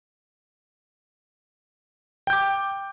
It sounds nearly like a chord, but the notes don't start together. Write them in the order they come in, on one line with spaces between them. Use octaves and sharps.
G5 G6 D6